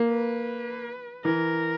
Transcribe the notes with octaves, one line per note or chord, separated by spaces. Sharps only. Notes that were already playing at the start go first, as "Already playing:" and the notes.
Already playing: A#3
B4
E3 A#4